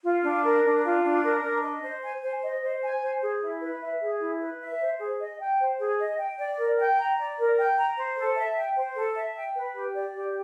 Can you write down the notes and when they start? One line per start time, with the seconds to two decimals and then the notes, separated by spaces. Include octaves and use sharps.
0.04 F4
0.24 D4
0.44 A#4
0.64 D4
0.84 F4
1.04 D4
1.24 A#4
1.43 D4
1.63 D#5
1.83 C5
2.02 G#5
2.22 C5
2.42 D#5
2.62 C5
2.82 G#5
3.02 C5
3.21 G#4
3.41 E4
3.61 B4
3.81 E5
4.01 G#4
4.20 E4
4.41 B4
4.60 E5
4.80 C5
5.00 G#4
5.19 D#5
5.40 G5
5.60 C5
5.79 G#4
5.99 D#5
6.19 G5
6.38 D5
6.58 A#4
6.78 G5
6.98 A#5
7.18 D5
7.38 A#4
7.57 G5
7.77 A#5
7.97 C5
8.17 A4
8.37 E5
8.56 G5
8.77 C5
8.96 A4
9.16 E5
9.36 G5
9.55 B4
9.75 G4
9.95 D5
10.15 G4